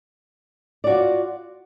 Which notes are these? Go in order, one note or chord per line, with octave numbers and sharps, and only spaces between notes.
F4 F#4 D5